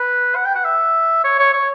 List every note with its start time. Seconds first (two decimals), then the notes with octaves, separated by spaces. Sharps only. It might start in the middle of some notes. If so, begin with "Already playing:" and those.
Already playing: B4
0.35 F#5
0.45 G5
0.55 F#5
0.65 E5
1.24 C#5
1.39 C#5
1.53 C#5